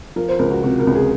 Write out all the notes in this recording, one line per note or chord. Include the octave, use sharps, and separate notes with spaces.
F3 A#4
C5
C#2 A#4
F#4
C3 F#4
A#4
C#2
G#4